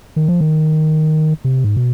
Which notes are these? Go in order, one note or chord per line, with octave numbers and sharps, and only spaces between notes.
D#3
F3
D#3
C3
G#2
B2